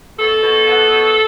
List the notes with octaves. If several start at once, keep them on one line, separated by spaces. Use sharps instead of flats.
B2 A4
B2
B3
B2